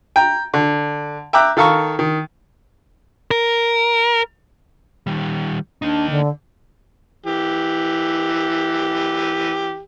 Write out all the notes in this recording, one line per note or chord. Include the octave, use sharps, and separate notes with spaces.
G5 A#5
D3
E5 G5 A#5 D6 F#6
D#3 A4 F5 A#5 C#6
D#3
A#4
D#3 G3
A#3 D4 D#4
D3
E3 G4